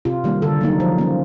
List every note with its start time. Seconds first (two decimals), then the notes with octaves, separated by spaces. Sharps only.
0.05 C3 F4
0.24 D#3 G3 A#3
0.42 D3 A4
0.61 F#3 A#3 D#4
0.80 F3
0.98 A#3 C#4